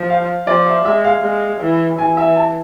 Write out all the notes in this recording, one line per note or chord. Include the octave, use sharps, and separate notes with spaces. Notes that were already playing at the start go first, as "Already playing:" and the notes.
Already playing: F3
F5
F3 D5
E5
G#3 E5
F5
G#3
E3
E3 G#5
E5
A5